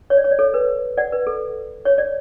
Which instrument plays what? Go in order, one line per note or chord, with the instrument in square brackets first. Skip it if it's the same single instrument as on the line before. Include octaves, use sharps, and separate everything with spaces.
[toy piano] C#5
D5
C#5
D5
A4 C#5
B4
D5 F#5
B4
A4
C#5
D5